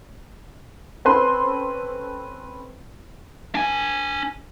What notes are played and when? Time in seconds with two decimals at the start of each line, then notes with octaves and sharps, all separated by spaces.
1.05 C4 C#4 A4 B4 C5 C6
3.55 D4 G#5